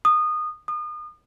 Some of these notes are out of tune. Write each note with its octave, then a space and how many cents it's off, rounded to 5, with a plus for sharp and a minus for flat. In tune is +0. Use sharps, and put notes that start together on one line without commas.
D#6 -20
D#6 -35